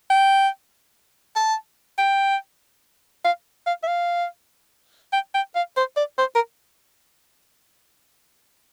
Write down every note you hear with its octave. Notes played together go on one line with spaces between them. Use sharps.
G5
A5
G5
F5
F5
E5
F5
G5
G5
F5
C5
D5
C5
A#4